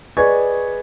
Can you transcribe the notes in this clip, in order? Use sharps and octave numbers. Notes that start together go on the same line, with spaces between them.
G#4 B4 D5 D#5 C#6 G#6